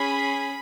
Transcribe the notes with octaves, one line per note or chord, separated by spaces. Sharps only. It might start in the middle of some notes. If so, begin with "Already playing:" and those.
Already playing: C#4 G#4 B5